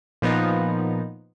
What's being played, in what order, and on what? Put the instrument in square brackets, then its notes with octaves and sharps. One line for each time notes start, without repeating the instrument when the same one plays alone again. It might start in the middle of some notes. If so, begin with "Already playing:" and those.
[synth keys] A#2 F3 B3 D#4